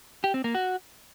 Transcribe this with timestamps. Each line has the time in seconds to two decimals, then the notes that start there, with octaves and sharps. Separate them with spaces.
0.24 G4
0.34 C4
0.44 A#3
0.55 F#4